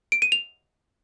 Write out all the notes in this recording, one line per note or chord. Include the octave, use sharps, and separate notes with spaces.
D7
D#7
F7